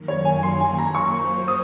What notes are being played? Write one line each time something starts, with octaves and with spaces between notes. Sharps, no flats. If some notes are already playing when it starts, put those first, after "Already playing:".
Already playing: F#2 D#3 F#3 A#3
C#5
G#5
C6
G#5
A#5
F#3 A#3 F4 C5 C#6
D#6